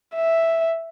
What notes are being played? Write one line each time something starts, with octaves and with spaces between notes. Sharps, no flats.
E5